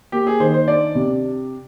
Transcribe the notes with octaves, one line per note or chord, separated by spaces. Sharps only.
A#3 G4
G#4
D#3 C5
C5
D4 D5
C3